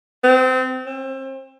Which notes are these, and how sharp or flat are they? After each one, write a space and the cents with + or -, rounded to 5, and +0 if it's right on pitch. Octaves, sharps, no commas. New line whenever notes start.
C4 -25
C4 +35